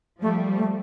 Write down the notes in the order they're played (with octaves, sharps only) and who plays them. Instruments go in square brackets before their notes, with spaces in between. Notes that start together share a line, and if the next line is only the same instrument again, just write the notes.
[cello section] F3 G3 [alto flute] A3
[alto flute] A3